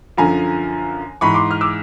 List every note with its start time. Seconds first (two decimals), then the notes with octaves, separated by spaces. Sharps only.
0.17 F#2 D3 F3 G#5 A#5
1.21 G#2 E3 B5 C#6
1.34 C6 D6
1.51 F6
1.61 D6 E6